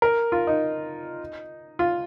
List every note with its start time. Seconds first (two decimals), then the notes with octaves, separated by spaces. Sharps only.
0.02 A#4
0.32 F4
0.47 D#4
1.79 F4